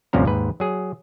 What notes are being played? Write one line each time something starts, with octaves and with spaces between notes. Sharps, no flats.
G1 D2 C3 F3 C#4 A#5
D#2 G#2 B4
F#3 G#4